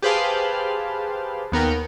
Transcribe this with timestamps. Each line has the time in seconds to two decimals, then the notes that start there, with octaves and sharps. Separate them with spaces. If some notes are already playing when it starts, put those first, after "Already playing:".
0.02 G4 G#4 B4 C5 F5 A5
1.52 D#2 B3 A#4 G5